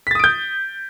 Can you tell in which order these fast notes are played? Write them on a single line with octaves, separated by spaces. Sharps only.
B6 A6 D#6 D7 G6